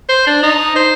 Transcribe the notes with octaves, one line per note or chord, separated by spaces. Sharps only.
C5
D4
D#4
C5